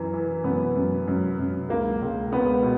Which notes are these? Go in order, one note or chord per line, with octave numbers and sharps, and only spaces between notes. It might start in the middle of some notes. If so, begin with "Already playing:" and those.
Already playing: F#2 E3
E3
F#2 B3
F#2
F#2
F#2
C#2 A#3
C#2
C#2 B3
B2